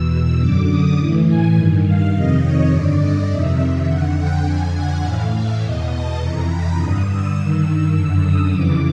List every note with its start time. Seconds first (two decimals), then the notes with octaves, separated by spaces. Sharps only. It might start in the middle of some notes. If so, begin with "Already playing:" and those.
Already playing: E2 B2 E6
0.39 F#2 D3 D6
0.68 D#6
0.97 A2 E3
1.26 G#5
1.55 G2 D#3
1.85 F5
2.13 F2 C3 D#3 D#5
2.42 C#5
2.71 G2 D3 D5
3.00 D#5
3.29 F2 C3 D#3 E5
3.87 F2 D3 F#5
4.16 G5
4.44 F2 D3 G#5
4.74 F#5
5.02 A2 E3 F5
5.32 E5
5.61 E2 B2 D#5
5.90 A5
6.19 F2 C3 E3 A#5
6.48 B5
6.76 G2 D3 D#6
7.06 E6
7.35 G2 D#3
7.64 E6
7.93 F#2 D3
8.22 D#6
8.50 F2 C#3 E3 D6